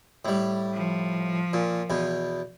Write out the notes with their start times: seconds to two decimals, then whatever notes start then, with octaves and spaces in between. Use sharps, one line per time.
0.25 A2 G3
0.74 F3
1.53 A#2
1.90 E2 B2